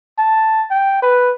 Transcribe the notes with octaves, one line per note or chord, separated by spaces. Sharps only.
A5
G5
B4